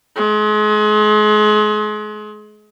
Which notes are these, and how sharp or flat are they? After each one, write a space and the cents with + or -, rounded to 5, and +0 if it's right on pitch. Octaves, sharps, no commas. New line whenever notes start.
G#3 +35